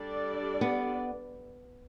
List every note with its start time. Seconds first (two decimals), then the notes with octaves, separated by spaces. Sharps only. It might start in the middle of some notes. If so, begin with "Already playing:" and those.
Already playing: G3 D4 A4 D5
0.61 B3